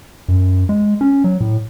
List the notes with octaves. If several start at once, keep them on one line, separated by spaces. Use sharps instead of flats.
F#2
G#3
C#4
F#3
A2